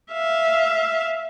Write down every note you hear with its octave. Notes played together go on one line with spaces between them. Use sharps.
E5 F5